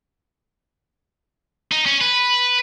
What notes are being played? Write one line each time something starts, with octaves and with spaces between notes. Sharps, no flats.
D#4
C#4
B4